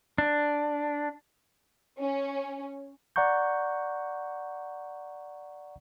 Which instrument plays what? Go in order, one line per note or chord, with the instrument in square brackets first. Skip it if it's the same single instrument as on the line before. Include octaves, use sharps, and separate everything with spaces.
[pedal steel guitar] D4
[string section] C#4
[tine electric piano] D5 F#5 A#5 C#6 G6